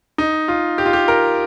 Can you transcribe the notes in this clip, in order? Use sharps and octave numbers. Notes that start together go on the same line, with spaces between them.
D#4
F4
G4
F4
G4
A#4